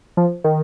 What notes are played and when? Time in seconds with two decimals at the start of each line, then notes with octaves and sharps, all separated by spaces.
0.17 F3
0.44 D#3